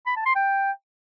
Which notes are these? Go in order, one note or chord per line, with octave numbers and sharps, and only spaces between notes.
B5
A5
C6
G5